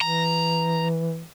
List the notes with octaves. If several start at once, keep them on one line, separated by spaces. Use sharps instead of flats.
E3 A#5